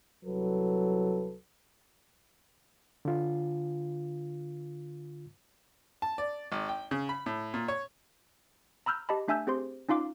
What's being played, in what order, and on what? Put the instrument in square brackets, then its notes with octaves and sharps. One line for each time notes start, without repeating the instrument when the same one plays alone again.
[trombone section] C2 F#3 A4 B4
[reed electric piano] D3 F4
[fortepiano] A5
D5
G#1
G5
C#3
B5
A2
A#2
C#5
[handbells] A#5 B5 E6 F6 G6
G4 D#5 A5 B5
A3 D4 E5 G#5 E6 G6
C4 G4 G#4 C5 C6
C#4 D#4 F4 F5 D6